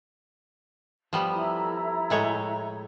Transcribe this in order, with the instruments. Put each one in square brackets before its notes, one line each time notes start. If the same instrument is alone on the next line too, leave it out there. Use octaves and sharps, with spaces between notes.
[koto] F3 G3 B3
[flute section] E4 A4 A#5
[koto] A2 G#3 C#5